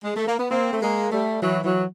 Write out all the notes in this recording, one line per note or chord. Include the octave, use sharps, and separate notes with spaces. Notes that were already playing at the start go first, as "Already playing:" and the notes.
G#3
A3
A#3
B3
A#3 C4
A3
G#3 A#3
G3 A3
E3 F#3
E3 F#3